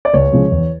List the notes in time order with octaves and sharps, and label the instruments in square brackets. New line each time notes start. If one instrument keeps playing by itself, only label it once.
[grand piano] D5
C#2 C#5
C#3 F3 G#3
E2